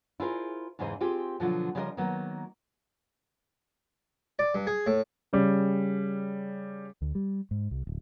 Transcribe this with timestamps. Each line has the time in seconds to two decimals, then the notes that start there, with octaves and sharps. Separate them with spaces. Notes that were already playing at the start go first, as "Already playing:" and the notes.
0.20 E4 F4 G#4 A#4 C5
0.79 E2 G#2 C#3 E3 C5 D#5
1.01 C4 F4 G4 G#4
1.40 B2 D3 F3 F#3 F4
1.75 C#3 F3 G3 F4 A#4 D#5
1.97 D#3 F#3 A#3 B3
4.39 D5
4.54 G2
4.67 G#4
4.87 A2
5.33 C#3 G3
7.02 D2
7.15 G3
7.51 G#2
7.71 C2
7.87 D1